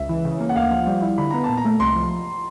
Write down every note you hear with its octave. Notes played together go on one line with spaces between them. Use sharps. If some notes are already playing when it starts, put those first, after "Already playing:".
Already playing: C#2 E5
E3
C#3
A#3
F#5
D2 F5
F3
G3
E4
D3 B5
B3 A#5
A#2 A5
A#5
A3
C2 C6
F3